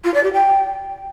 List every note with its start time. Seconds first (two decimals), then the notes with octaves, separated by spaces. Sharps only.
0.04 F4
0.13 D5
0.23 G4
0.33 G5